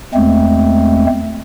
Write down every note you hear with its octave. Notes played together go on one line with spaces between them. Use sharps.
E2 G#3 A3 C4